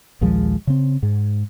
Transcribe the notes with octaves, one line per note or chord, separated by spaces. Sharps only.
A#1 D#2 F3 G#3
C#3 C4
G#2